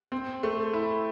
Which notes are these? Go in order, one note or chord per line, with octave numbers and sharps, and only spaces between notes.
C4
A3
E4